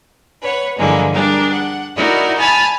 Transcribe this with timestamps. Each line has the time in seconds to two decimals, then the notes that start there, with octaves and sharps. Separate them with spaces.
0.40 B4 C#5 F#5
0.77 G2 D3 E3 F3 G#3 A#3
1.11 G3 D4 G#4 A#4
1.52 F#5
1.95 D#4 E4 F#4 A#4 D5
2.38 G#5 A5 B5 F6 G#6 A6